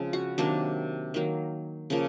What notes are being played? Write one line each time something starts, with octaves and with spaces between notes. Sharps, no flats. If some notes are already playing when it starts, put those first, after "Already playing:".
Already playing: C#3 F3 G#3 C4
F#4
C3 D#3 F#3 A#3 D4
D#3 F#3 A#3
C#3 F3 A#3